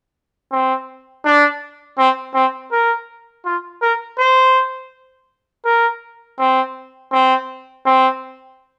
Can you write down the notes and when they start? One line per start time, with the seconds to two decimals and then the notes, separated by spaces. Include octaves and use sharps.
0.52 C4
1.25 D4
1.98 C4
2.35 C4
2.72 A#4
3.45 F4
3.82 A#4
4.19 C5
5.65 A#4
6.39 C4
7.12 C4
7.86 C4